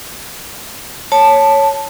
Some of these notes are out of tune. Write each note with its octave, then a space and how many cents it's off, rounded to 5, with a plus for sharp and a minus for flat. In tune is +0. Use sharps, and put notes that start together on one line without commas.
C#5 +0 A5 +0